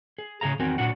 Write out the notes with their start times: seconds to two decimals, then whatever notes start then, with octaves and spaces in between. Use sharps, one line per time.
0.18 G#4
0.41 A2 C#3 B3 G#4 F5 A#5
0.59 E2 D#3 C4 F#4 A#4 G#5
0.78 A#2 D4 F#4 F#5